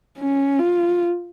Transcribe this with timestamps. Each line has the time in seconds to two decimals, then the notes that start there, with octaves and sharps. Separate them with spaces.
0.18 C#4
0.59 F4